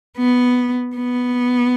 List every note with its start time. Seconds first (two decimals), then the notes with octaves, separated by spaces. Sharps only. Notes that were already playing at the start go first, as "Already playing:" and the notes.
0.17 B3
0.96 B3